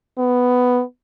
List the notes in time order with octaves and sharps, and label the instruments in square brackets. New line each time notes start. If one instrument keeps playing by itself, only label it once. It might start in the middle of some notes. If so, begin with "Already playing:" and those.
[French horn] B3